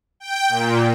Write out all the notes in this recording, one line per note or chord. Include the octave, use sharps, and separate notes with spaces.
G5
A#2